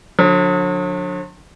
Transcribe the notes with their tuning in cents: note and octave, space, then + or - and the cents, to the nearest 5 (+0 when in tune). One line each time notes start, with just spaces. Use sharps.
D3 +0 F#3 -45